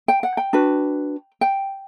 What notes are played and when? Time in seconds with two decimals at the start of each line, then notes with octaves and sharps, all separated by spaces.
0.08 G5
0.23 F#5
0.37 G5
0.53 D4 F#4 B4
1.41 G5